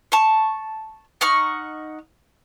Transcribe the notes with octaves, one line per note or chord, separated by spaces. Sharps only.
A5 C#6
D#4 F#5 C#6 F6